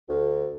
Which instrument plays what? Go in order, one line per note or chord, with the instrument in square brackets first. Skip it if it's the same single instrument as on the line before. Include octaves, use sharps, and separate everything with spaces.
[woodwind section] D2